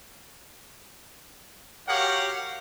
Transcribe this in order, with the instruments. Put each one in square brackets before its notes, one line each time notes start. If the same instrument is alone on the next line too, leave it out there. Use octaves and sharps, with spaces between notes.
[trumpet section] F#4 G4 A#4 C#5 F5 F#5